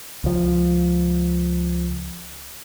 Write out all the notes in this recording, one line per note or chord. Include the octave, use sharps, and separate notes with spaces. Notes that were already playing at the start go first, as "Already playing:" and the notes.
C#2 F3